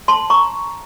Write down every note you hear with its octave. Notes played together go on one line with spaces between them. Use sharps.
A5 C6
A#5 C#6